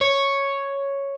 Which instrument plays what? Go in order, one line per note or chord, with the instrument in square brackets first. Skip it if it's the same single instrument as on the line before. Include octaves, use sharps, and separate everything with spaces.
[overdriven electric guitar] C#5